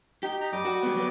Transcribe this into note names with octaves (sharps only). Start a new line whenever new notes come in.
D#4 G4
D#4 A#5
F#2 G3 D#5 D6
F#4
G#3 B3
F#3 B3